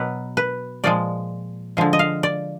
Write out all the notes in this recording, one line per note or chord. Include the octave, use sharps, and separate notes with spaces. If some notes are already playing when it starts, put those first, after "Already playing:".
Already playing: B2 F#3 B4
B4
A#2 F3 G#3 D5
D3 F3 G#3
D#5
F5
D5